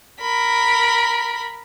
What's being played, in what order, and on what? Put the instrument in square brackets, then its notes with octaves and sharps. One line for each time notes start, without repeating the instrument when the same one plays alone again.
[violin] A#4 B5